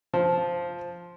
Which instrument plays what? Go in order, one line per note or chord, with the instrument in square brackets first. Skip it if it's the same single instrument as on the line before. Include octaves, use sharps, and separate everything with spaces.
[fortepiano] F3